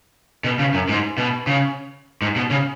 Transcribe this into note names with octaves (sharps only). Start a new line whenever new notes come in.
B2
C#3
F#2
G#2
B2
C#3
G#2
B2
C#3